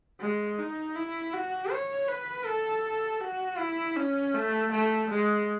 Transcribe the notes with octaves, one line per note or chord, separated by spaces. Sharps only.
G#3
D#4
E4
F#4
C#5
B4
A4
F#4
E4
C#4
A3
A3
G#3